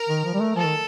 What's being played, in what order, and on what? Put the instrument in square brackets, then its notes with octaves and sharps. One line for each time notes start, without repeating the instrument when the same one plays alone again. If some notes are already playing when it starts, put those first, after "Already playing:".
Already playing: [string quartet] A#4
[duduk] D#3
F3
G3
A3
[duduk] F3 [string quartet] A4
[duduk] D#3